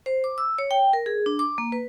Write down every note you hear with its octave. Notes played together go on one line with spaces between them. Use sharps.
C5
D6
E6
C#5
G5
A#4
G#4
D4
D6
A#3
B4